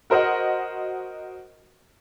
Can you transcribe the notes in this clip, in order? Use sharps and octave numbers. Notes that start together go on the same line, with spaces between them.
F#4 A#4 C5 D#5 F#5